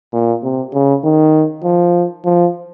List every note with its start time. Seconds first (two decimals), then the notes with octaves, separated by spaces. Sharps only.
0.13 A#2
0.43 C3
0.73 C#3
1.04 D#3
1.64 F3
2.25 F3